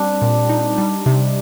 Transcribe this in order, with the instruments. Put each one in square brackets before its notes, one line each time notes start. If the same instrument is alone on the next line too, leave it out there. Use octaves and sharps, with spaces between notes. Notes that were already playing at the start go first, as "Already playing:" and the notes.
Already playing: [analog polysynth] G3 C4 [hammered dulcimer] D4
[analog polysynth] A#2
D#4
G3
C3